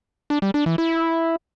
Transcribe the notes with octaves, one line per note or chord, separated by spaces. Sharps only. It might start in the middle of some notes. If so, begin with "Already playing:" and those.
D4
G3
D4
E3
E4